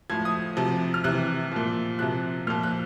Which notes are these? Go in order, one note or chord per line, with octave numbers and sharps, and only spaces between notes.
A2 F3 G#6
D#6
C3 F3
F6
C3 E3 F#6
A#2 F3
C3 F3 F#6
A#2 F3 F6
F#6